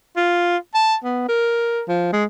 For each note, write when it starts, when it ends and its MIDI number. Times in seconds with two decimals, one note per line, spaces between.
0.17 0.57 65
0.75 0.96 81
1.04 1.25 59
1.29 1.82 70
1.88 2.08 53
2.13 2.25 56